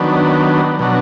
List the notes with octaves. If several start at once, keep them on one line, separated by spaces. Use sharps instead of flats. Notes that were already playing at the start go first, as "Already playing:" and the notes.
Already playing: D#3 F#3 B3 D4
B2 F#3 D4